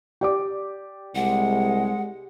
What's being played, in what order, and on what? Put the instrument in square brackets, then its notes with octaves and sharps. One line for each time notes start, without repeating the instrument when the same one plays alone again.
[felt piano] G4 D5 D6
[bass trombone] C2 [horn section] G#3 [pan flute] F#5